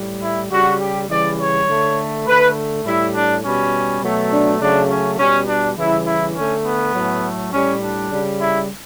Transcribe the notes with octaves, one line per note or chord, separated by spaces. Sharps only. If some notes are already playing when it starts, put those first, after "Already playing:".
Already playing: A2 G3
E4
C#3 G3 F#4
G4
C#3 E3 G3 D5
C#5
D3 A3
D3 A3 B4
A2 G3 E4
D4
B2 G3 C#4
B2 F#3 A3
D4
C#3 F#3 A3 D4
C#4
B2 G3 C#4
D4
C#3 E3 G3 E4
E4
D3 A3 C#4
B3
A2 F#3 A3
A2 G3 C#4
D4
C#3 G3
E4